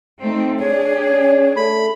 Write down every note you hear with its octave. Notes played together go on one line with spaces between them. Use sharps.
A3 C4 D#4
D4 G#4 C#5
C#4
A3 B5